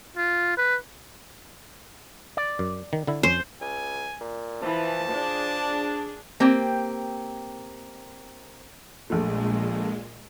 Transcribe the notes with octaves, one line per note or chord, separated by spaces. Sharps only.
F4
B4
D5
F#2
D#3
D3 E4
F2 C#4 C5
C#2 G#5
A#2
E3 F3 A5
D4 G#4
A#3 C4 G4
A#1 A#2 G#3 A3